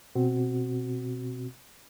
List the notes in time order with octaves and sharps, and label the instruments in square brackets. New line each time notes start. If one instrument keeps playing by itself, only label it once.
[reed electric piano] B2 C4 F#4